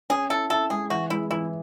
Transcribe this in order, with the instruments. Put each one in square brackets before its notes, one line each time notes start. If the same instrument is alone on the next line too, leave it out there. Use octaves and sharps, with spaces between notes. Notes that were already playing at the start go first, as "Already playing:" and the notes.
[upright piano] C#4 [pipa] G#4
[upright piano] E4 [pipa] A4
[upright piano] E4 [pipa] A4
[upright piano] G#3 [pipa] G#4
[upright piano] E3 [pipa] F#4
[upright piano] G#3 [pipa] E4
[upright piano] E3 [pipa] E4